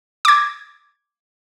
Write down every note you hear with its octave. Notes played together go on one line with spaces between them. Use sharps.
D6 G#6